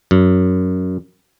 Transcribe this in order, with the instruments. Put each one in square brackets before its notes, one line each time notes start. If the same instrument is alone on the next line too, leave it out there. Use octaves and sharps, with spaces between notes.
[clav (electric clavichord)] F#2